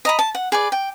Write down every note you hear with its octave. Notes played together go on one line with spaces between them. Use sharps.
D#5 A#5 B5
A5
F#5
G#4 B4 D5
G5